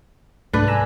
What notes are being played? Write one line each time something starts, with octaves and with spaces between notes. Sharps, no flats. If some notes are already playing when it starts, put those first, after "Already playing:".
C2 G#2 A3 D4 B4
G#5 A#5 E6